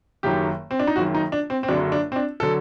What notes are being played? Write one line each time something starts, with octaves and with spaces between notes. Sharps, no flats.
F#1 F#2 D#3 F#3 G4
C4
D4
D#4
F#1 F#2 D#3 F#3 F#4
D#4
D4
C4
C4
F#1 F#2 D3 F#3 D4
D4
C4
D4
D3 F#3 A4